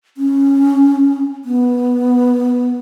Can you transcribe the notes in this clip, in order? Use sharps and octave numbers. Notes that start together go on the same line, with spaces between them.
C#4
B3